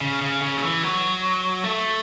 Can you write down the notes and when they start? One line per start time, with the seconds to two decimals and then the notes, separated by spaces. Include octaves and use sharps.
0.01 C#3
0.22 C#3
0.42 C#3
0.57 F#3
0.62 E3
0.83 F#3
1.64 A3